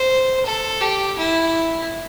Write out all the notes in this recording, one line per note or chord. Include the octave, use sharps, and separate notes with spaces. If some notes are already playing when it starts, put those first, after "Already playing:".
Already playing: C5
A4
G4
E4